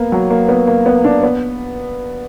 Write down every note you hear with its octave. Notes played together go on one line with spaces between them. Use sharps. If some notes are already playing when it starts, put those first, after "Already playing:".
Already playing: A#3 B3
F#3
A#3
B3
A#3
B3
D4
B3